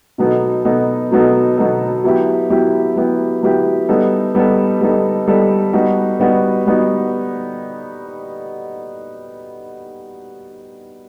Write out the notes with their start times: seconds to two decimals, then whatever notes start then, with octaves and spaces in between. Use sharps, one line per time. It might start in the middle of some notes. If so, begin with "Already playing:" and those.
0.18 B2 F#3 B3 D#4 A4
0.65 B2 F#3 B3 D#4 A4
1.11 B2 F#3 B3 D#4 A4
1.57 B2 F#3 B3 D#4 A4
2.04 F#3 B3 E4 G4
2.50 F#3 B3 E4 G4
2.96 F#3 B3 E4 G4
3.43 F#3 B3 E4 G4
3.89 G3 B3 D#4 A4
4.35 G3 B3 D#4 A4
4.81 G3 B3 D#4 A4
5.27 G3 B3 D#4 A4
5.73 G3 B3 D#4 F#4
6.20 G3 B3 D#4 F#4
6.66 G3 B3 D#4 F#4